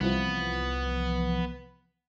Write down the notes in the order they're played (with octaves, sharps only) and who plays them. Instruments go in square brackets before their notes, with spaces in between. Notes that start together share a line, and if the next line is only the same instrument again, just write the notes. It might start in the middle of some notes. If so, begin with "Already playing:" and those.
[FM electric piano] C2 E3 F3 [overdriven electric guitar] B3